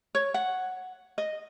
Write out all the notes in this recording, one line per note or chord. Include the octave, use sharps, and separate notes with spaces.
C#5
F#5
D#5